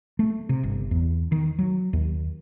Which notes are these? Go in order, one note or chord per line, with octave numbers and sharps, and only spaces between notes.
A3
C3
G1
E2
D#3
F#3
D#2